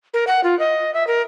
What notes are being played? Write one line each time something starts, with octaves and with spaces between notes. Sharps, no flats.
A#4
F#5
F4
D#5
E5
A#4